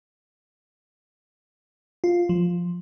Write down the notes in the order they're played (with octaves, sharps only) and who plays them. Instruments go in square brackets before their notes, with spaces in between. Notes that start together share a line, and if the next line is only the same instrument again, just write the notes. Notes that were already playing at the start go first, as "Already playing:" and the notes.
[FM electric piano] F4
F3